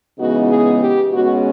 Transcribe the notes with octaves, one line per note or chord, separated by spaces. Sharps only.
C#3 E3 G#3 B3 D#4 F#4
G#4
G4
B2 G#3 C#4 F#4